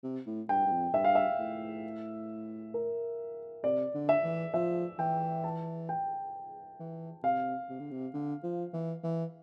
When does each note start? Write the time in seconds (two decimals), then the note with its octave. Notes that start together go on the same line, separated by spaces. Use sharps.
0.03 C3
0.26 A2
0.49 G2 G5
0.66 G2
0.72 F2
0.94 G2 E5
1.04 F5
1.15 E5
1.39 A2
2.74 A#4
3.64 C3 D5
3.94 D3
4.09 E5
4.24 E3
4.54 F3 E5
4.99 E3 G5
5.44 A5
5.89 G5
6.79 E3
7.23 C3 F5
7.69 C3
7.80 D3
7.91 C3
8.13 D3
8.43 F3
8.73 E3
9.03 E3